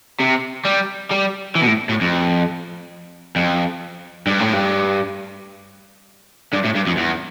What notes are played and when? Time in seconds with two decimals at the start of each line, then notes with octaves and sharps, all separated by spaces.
0.20 C3
0.65 G3
1.11 G3
1.55 E3
1.61 B2
1.67 A2
1.89 A2
2.01 F2
3.36 F2
4.27 G2
4.40 A2
4.53 G2
6.53 G2
6.64 A2
6.75 G2
6.86 F2
6.97 E2